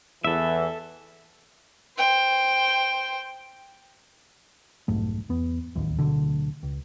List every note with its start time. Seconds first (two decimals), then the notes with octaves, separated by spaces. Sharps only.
0.24 E2 E3 A4 E5
1.97 C5 G5
4.88 F1 B1 G#2 A3
5.29 E2 B3
5.75 D1 A1 D#2
5.99 D1 A#1 B2 D3
6.63 C#2